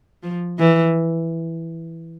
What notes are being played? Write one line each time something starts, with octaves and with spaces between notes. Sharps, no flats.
F3
E3